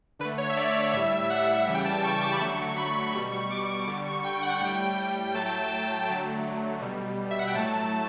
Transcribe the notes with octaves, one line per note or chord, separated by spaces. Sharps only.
D3 B4
A3
C#5
E5
D5
D5
A2 G3 E5
F#5
C#3 E3 G3
G5
A5
C#6
C#6
D6
B5
D3 F#3 A3 C#6
B5
B2 G3 B5
C#6
D6
C#6
D3 G3 D6
C#6
G5
F#5
A2 G3 G5
G5
A2 F#3 A3 A5
G5
A5
D3 F#3 A3
B2 G3
E5
F#5
G5
A2 F#3 A3 A5